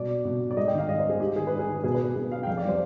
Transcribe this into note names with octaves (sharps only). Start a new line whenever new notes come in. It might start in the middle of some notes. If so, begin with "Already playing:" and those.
Already playing: B2 D5
B2
D5
G#2 D#5
G5
D#3 F5
G#2 D#5
C5
D#3 G#4
G#2 G4
D#3 G#4
B4
G#2
G#4
D#3
B2 G#4
B4
B2 G#4
F5
G5
F2 F5
D5
C3 F3 C5